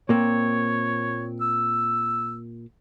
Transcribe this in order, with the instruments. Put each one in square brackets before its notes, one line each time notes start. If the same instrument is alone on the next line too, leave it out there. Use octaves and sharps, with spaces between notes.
[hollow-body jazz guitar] A#2 A#3 C4 [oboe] C#5
[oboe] E6